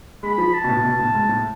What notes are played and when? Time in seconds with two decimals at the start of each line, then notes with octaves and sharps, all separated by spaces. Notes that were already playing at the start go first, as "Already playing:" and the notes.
0.23 G#3 B5
0.38 F3
0.54 A5
0.64 B2
0.69 A2
0.85 B2
0.99 A2
1.15 G#2
1.29 A2